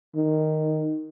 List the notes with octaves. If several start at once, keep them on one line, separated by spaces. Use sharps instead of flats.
D#3